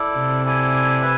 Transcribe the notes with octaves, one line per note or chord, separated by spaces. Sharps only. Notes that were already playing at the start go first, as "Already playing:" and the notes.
Already playing: E4 A4 D5
C3
E4 A4 D5 G#5
B4 E5 G#5